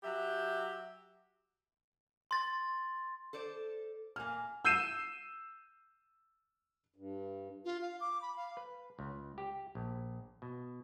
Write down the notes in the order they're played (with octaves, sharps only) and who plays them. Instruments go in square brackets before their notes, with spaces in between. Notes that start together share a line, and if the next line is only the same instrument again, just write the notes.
[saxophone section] F#3 G4 E5
[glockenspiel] C6 A6
[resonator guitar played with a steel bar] A4 C5 D5
[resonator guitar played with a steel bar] A#2 A#3 [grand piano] G#5 F6
[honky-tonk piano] E6 G6 C7 D#7 E7
[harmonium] G2
[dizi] F4
F5
D6
B5
F5
[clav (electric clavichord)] B4
C#2
G4
A#1
B2